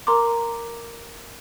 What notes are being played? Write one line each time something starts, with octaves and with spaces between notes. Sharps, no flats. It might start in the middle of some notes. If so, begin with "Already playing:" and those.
A#4 A#5 C6 D6